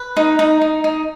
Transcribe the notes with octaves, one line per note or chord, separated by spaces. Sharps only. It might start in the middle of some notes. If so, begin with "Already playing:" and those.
Already playing: B4
D#4
D#4
D#4
D#4